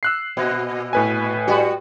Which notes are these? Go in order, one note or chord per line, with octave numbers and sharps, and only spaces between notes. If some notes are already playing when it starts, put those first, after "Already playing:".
E6 F#6 C7
A#2
A2 B4 G#5
G3 F#4